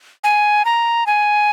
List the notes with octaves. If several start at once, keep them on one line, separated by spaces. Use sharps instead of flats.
G#5
A#5
G#5